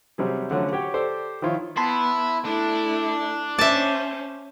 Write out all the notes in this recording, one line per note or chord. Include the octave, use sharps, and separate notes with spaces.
C3 F#3 G3 G#4
D3 F3 F#3 A3 C#4
F#4 G4 C#5 G5
G4 A4 C5 D5
D#3 F3 E4 F4 C#5
B3 E4 A5 B5 C6
A3 D4 E4
C#4 C5 E5 A5 D6